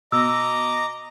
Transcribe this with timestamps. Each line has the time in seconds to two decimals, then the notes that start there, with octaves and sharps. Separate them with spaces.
0.12 B2 D#5 A#5 D6 E6